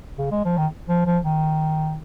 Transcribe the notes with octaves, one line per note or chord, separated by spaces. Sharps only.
C#3
G#3
F3
D#3
F3
F3
D#3